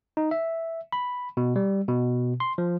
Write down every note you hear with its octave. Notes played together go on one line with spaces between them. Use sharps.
D#4
E5
B5
B2
G3
B2
C6
F3